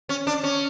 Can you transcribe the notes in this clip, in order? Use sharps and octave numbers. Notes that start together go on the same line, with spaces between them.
C#4
D4
C#4